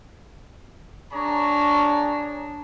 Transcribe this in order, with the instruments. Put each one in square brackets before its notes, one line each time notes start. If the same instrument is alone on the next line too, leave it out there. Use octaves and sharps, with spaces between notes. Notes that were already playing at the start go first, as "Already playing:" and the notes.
[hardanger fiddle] D4 [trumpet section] G#4 C#5 A#5